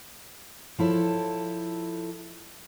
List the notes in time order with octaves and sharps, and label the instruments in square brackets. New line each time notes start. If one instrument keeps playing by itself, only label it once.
[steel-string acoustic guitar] F3 E4 A4 C#5